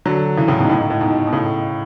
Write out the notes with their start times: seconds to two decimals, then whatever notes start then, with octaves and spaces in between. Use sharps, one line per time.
0.06 D3 F#3
0.37 C#3 E3
0.48 A2 C#3
0.58 G#2 B2
0.69 A2
0.79 G#2
0.90 A2
1.01 G#2 B2
1.27 B2
1.33 A2 C#3